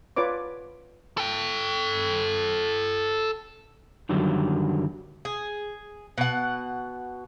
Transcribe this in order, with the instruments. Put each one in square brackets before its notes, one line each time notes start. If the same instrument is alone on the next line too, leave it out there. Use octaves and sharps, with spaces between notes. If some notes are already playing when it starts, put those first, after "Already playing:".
[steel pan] F4 B4 C#5 D5 D6
[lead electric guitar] A4 G5
[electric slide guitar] F#2 D3 D#3 F#3 G3
[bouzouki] G#4
B2 F#5